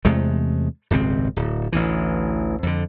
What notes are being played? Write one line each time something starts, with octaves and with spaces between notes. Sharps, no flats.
E2 C3 G#3 A3
D#1 G#1 C#2 C4
D1
A1 D2 E3
F2 D3